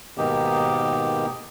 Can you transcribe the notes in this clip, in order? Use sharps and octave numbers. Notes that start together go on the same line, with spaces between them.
G#2 B2 D#3 A#3 D#4 G4